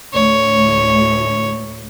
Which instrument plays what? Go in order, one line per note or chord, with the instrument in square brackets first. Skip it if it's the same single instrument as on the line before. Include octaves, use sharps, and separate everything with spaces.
[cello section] D2 A2 [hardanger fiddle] C#5